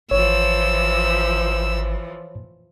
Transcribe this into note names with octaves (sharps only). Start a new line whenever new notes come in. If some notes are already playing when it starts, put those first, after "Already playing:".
G#1 E3 F3 C#5 E6